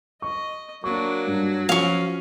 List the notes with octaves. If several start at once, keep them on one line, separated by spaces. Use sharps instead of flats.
D#5 C#6
F#3 A#3 D4 C#6
G2
F3 F#3 C#4 F5 C#6